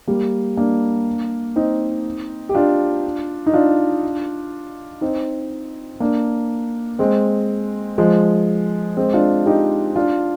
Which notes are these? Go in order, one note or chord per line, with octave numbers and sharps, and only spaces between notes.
G3 A#3
A#3 D4
C4 D#4
G4
D4 F4
D#4
D4 F4
C4 D#4
A#3 D4
G#3 C4
F3 G#3
G#3 C4
D4 F4
D#4 G4
D4 F4